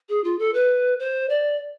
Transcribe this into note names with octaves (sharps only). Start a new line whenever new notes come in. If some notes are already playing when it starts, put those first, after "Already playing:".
G#4
F4
A4
B4
C5
D5